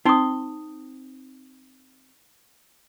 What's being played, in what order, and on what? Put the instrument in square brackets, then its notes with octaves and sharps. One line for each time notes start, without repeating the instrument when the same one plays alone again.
[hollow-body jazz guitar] C4 C6 [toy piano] D#4 D#6